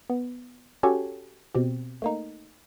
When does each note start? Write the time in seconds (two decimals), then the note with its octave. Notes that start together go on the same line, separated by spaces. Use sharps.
0.10 B3
0.83 C#4 F#4 G4 A4 C#5 G#5
1.55 B2 C4 G4
2.02 A3 A#3 D#4